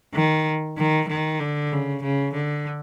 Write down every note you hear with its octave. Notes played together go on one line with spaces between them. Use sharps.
D#3
D#3
D#3
D3
C#3
C#3
D3